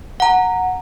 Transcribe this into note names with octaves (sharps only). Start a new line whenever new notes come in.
F#5 A#5